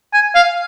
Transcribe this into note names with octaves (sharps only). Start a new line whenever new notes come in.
G#5
F5